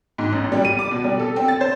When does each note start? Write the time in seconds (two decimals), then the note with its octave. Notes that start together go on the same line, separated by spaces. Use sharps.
0.18 G#2
0.32 A1
0.52 G3
0.65 D#7
0.79 D6
0.91 B2
1.04 G3
1.19 A4
1.36 C4
1.48 A6
1.61 C5